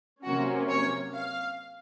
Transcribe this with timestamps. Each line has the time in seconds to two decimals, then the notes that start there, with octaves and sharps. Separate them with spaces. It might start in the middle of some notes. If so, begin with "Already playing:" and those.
0.24 C3 F#3 A#3 C#4 F#4
0.69 C#5
1.14 F5